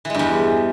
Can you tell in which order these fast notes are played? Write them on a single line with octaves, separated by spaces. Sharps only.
E3 G#3 G2 E2